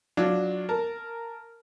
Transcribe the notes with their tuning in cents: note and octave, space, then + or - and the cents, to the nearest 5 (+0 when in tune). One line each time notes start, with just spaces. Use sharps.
F#3 -10 D4 +0 F4 +0
A#4 -10 A5 -5